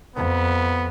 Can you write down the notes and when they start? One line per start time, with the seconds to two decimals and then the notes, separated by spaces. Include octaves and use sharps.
0.16 F2 B3